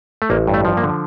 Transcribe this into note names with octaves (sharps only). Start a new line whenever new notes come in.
A3
A1 A#3
G2
A3
F3
A#3
D3